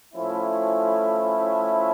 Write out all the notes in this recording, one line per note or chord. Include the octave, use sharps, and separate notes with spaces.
A2 F3 A3 C#4 E4